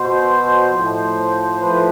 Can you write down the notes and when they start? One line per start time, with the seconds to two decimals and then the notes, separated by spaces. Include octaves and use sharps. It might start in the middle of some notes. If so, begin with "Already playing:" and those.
Already playing: B2 C5
0.70 A2 F3
1.61 A2 F3 B4